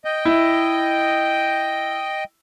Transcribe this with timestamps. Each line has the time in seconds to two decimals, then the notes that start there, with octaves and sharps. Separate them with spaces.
0.05 D#5 G5
0.25 E4